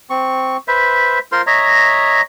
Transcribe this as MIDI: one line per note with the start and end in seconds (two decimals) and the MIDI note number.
0.10 0.57 60
0.10 0.57 85
0.68 1.19 71
0.68 1.19 72
0.68 1.19 76
1.32 1.42 65
1.32 1.42 70
1.32 1.42 72
1.32 1.42 84
1.47 2.21 73
1.47 2.21 75
1.47 2.21 76
1.47 2.21 82